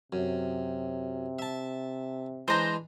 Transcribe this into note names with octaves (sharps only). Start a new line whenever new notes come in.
F#2 C3
E5 A5
E3 G#3 D4 C5 A#5